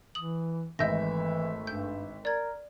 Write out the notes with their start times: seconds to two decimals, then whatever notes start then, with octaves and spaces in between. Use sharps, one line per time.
0.15 E3 D#6 F#7
0.79 G#1 E3 A3 D#5 E5 G6 A#6
1.67 G2 G6
2.25 A#4 D5 G#6